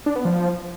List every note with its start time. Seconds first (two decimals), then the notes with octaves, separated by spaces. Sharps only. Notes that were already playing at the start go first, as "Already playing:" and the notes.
0.06 D4
0.16 B3
0.25 F3